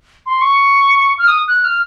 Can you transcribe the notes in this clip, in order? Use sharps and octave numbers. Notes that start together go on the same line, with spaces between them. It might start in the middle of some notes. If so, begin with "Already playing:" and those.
C6
C#6
F6
D#6
F#6
F6